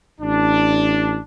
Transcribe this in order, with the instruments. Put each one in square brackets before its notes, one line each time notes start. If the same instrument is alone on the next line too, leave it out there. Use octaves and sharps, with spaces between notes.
[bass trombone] A1 [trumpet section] D4